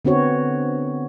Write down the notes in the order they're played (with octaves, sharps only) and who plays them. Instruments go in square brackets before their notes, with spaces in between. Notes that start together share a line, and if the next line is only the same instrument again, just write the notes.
[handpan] D3 B3 C4 F#4 C#5